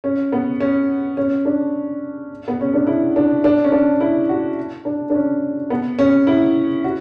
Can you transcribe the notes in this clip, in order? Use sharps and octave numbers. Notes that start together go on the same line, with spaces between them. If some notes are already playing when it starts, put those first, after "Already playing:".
C#4
B3
C#4
C#4
D4
B3
C#4
D4
E4
D4
D4
C#4
D4
E4
F#4
D4
D4
C#4
B3
C#4
E4
F#4